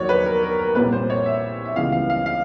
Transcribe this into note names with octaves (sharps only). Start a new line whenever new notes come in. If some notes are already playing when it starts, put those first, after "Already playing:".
Already playing: D#2 D#3 F#3 C#5 D5
B4
A#4
A#4
A#4
C2 A#2 G3 B4
C5
C#5
E5
E5
C#2 C#3 E3 G3 B3 F5
F5
F5
F5